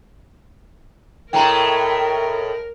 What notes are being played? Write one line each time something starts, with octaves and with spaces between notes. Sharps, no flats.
A2 G#3 A3 A#4 G5 A#5